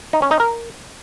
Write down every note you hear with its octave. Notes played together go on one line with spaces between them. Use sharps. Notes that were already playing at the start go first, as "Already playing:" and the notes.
D#4
C#4
D#4
A#4